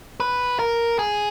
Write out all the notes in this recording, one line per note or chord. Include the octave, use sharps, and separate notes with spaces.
B4
A#4
G#4